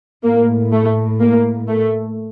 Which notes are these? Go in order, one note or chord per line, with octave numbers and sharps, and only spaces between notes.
A2 A#3
A3
A#3
A3